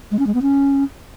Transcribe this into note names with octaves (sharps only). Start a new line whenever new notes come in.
G#3
C#4
G#3
B3
C#4